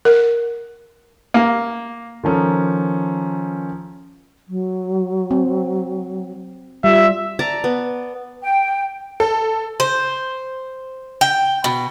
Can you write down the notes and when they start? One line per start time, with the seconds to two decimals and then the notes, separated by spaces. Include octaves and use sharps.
0.05 A#4
1.34 A#3
2.24 D#3 F3 C#4 A4
4.48 F#3
5.31 C4
6.84 G3 F4 E5
7.39 D5 A5 A#5
7.64 B3
8.42 G5
9.20 A4
9.80 C5
11.21 G5
11.64 B2